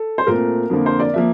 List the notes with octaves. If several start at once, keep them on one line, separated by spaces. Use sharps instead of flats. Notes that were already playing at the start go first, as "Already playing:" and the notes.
Already playing: A4
C5
A#2 A3 C4 A#4
F2 D3 F3 A#3
C5
D5
F3 A#3 E5